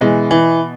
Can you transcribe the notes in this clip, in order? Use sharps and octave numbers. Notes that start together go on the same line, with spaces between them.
B2 E3 G#3
E3